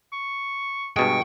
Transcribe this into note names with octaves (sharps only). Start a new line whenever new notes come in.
C#6
G2 B2 G#3 G5 C#6